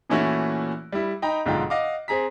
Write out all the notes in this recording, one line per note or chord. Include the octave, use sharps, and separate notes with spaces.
A#2 E3 A3 C#4 E4 F#4
G3 E4
D#4 G5 A#5 B5
B1 G#2 D3 F4 G5
D#5 F5 F#5 D6
C4 G#4 A#5 B6